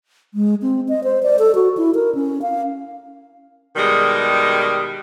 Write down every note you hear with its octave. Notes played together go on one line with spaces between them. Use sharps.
G#3
C4
D#5
C5
D5
A4
F#4
E4
A#4
C#4
F5
B2 D#3 G3 G#3